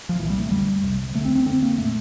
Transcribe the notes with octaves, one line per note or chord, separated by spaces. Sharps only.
F3
C2 A#2 E3
G3
A3
F2 D3 G3
C2 C3
D2 D3 A3
C4
C4
F2 D3 C4
A#3
A#2 A3